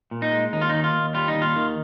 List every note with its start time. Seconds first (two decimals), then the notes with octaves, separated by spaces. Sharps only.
0.11 A#2
0.22 D#4
0.32 G#3
0.53 D#2 D#4
0.61 F4
0.69 D#3 D#4
0.84 F4
0.94 D#2
1.14 G3 F4
1.28 D#4
1.35 D#2
1.42 F4
1.56 D#3